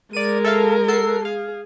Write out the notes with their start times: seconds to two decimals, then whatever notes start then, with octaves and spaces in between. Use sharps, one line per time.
0.13 G#3 A#4 D5 D#7
0.45 A4 E5 F5
0.88 A4 F#5 C7
1.25 G#4 F5